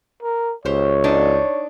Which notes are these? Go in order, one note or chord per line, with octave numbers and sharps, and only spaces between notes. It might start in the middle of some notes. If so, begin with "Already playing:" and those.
A#4
C#2 G4 C5 C#5
D4 D#4